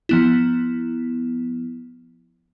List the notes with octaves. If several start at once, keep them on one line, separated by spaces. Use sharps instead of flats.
F3 B3 E4